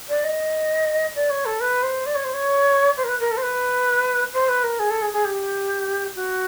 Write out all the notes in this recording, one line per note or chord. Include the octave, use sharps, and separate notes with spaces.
D5
D#5
D5
C#5
A4
B4
C5
D5
C#5
C5
C#5
C5
A#4
B4
A#4
A4
C5
B4
C5
B4
A#4
G#4
A4
G#4
G#4
G4
F#4